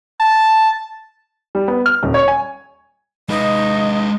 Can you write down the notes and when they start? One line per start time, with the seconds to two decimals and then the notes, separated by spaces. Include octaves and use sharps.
0.20 A5
1.55 G3
1.68 B3
1.86 F6
2.03 D#1
2.14 C#5
2.28 G#5
3.29 G#3 D#4 B4 D#5